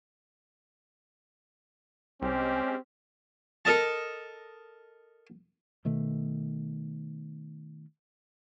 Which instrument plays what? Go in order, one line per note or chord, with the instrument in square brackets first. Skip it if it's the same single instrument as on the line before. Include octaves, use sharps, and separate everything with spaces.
[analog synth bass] C2 [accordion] G#3 C#4 G4 [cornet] C4
[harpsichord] A4 A#4 D#5 A5
[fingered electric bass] B2 D#3 A3